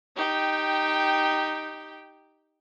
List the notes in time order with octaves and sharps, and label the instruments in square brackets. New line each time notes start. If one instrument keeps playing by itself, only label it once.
[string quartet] D#4 G4 G5